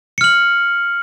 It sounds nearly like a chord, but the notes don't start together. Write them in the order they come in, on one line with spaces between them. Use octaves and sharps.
C#7 F6 F#7